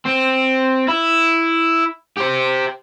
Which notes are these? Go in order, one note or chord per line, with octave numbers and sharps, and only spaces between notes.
C4
E4
G4 C5